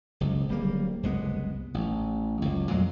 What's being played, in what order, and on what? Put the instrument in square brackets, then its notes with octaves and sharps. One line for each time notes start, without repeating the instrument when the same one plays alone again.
[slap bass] F#1 C#2
D1 G3 A#3
F#1 C2 G#3 B3
A1
F#1 C#2
F2 A#2 F#3 G#3